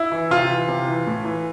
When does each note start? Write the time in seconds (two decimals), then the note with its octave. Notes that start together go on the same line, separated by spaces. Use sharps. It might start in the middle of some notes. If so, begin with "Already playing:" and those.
Already playing: E4
0.12 E3
0.30 C3 F4
0.49 E3
0.68 C3
0.88 E3
1.07 A2
1.25 E3